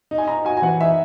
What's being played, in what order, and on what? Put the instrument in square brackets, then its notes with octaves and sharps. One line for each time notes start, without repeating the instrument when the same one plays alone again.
[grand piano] D#4
[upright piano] G#5
[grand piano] D#4 [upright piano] A#5
[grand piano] F#4 [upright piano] G#5
[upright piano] G#5
[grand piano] E3 [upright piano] F#5
[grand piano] D#4 [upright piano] E5